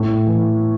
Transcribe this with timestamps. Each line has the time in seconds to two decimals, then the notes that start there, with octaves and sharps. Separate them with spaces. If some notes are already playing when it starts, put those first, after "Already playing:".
Already playing: A2
0.27 E3